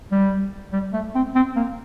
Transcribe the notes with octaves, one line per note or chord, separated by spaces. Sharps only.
G3
G3
A3
C4
C4
A#3